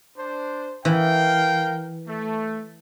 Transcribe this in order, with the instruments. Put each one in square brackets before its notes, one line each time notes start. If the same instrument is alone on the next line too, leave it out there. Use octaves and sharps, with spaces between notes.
[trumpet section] D4 C5
[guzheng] E3 [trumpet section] A#4 F5 G5
[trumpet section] A3